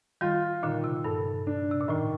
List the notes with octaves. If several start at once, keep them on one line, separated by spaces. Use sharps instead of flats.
D#3 G3 F4
A#2 D3 D#3
C3
G2 A4
D4
C3
A#2
A2 D#3